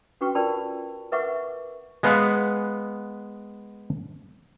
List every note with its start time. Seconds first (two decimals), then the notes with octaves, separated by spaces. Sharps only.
0.21 C#4 F#4 A4 B4 G5 C#6
0.35 F4 A#4 D5 G5 A5 B5
1.12 A#4 B4 E5 F#5 C#6 D6
2.03 G#3 B3 B4 F5 F#5